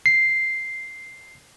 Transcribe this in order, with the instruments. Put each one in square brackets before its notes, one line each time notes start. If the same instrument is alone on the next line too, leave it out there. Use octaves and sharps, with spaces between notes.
[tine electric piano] C7